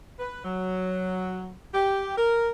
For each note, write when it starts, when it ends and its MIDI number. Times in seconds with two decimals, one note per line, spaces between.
0.19 0.41 71
0.45 1.52 54
1.74 2.14 67
2.17 2.50 70